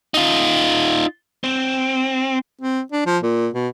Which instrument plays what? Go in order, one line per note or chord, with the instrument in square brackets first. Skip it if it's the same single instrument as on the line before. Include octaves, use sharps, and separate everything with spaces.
[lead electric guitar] D#4 F4
C4
[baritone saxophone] C4
D4
F3
A#2
B2